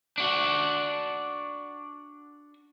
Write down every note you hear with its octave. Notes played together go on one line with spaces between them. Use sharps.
D4 F#4